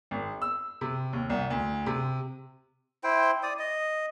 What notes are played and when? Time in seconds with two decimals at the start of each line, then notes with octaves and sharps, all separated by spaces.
0.11 G#1
0.42 E6
0.81 C3
1.13 D#2
1.30 C2
1.50 D2
1.86 C3
3.04 E4 C5 G5
3.43 D5 D#6
3.59 D#5